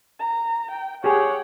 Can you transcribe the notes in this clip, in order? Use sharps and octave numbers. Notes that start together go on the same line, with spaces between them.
A#5
G5
G4 G#4 C#5 F#5 G5